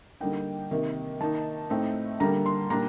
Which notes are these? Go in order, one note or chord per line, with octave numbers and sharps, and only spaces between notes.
D3 G3 A#3 D#4 G5
C3 D#3 A#3
D#3 A#3 D#4 A5
A2 A3 C4 D#4
D3 G3 A#3 A#5
C6
A#2 G3 D4 A#5